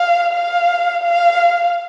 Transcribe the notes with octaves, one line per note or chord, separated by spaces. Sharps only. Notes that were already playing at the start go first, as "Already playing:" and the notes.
Already playing: F5
F5
F5